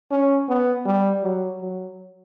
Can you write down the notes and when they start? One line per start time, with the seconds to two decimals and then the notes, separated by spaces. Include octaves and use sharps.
0.11 C#4
0.49 B3
0.86 G3
1.23 F#3
1.62 F#3